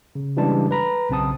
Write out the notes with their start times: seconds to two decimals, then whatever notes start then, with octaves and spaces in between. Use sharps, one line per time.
0.15 C#3
0.37 C#3 E3 G3 G#3 D4 A5
0.71 B4 A#5 B5
1.10 B1 C#3 C4 A5 D#6